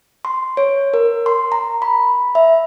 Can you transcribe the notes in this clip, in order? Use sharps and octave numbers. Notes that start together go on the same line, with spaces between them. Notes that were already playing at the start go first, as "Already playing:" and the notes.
C6
C#5
A#4
C6
A#5
B5
E5